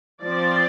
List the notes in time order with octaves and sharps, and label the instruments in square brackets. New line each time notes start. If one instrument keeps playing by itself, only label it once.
[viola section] F3 C4 D5